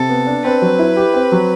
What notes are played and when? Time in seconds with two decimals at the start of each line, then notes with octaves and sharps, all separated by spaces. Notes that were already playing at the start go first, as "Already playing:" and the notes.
Already playing: C3 A4
0.09 B3
0.27 D4
0.44 C4 B4
0.62 F#3
0.79 E4
0.97 G4
1.14 C4
1.32 F#3